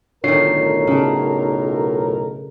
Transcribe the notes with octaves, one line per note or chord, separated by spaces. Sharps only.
B1 A2 D3 D#3 F4 A#4 C#5 C7
C#3 D4